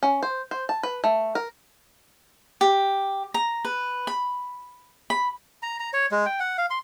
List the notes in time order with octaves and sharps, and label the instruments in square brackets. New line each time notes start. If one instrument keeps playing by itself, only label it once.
[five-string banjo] C#4
C5
C5
A5
B4
A3
A#4
[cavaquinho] G4
A#5
B4
B5
B5
[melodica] A#5
A#5
C#5
G#3
G5
F#5
F5
C6